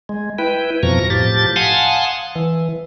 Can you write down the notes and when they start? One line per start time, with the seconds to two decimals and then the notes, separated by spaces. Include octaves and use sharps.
0.09 G#3
0.39 E4 B4 G5
0.83 F2 B2 F3 A#5 C#6 A#6
1.10 A2 F3 G4 A6
1.56 F5 F#5 G#5 A5 C6 D#6
2.35 E3